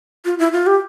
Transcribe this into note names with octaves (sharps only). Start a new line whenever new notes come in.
F4
E4
F4
G4